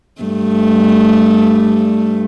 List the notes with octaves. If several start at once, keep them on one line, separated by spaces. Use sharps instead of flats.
G2 A3